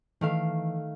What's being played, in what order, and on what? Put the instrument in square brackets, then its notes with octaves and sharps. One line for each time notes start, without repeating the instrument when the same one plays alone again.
[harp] D#3 A3 F5 [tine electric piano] E3